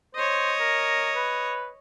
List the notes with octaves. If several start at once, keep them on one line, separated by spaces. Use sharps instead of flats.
C5 C#5 D#5
A#4
B4